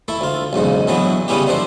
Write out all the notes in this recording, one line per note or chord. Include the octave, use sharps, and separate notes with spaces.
A3 E4 A4
D2 F4
B1 E2 G#2 C#3
A2 D3 E3 F#3 B3
C#3 G3 B3 C#4 E4 G4
D3 F3 D4 C5